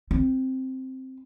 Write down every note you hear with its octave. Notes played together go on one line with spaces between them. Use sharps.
C4